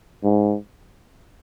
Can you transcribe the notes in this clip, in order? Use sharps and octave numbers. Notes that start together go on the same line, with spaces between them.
G#2